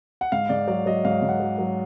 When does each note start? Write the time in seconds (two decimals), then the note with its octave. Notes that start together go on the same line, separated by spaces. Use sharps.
0.21 F#5
0.32 G#2 F5
0.49 G#2 D5
0.68 F#3 D5
0.86 F#3 D#5
1.05 G#2 F5
1.22 G#2
1.29 F#5
1.40 F#3
1.59 F#3